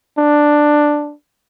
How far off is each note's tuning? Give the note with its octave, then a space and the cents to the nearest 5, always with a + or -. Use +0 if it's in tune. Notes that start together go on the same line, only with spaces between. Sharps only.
D4 +5